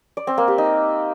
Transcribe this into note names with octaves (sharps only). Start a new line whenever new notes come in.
D5
C4
A#3
G4
D#4